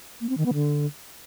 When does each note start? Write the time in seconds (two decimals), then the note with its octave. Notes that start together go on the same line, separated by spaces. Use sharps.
0.21 A#3
0.29 C4
0.37 D#3
0.46 B3
0.54 D3